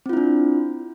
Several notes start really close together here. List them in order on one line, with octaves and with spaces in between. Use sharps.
C4 F4 E4 D4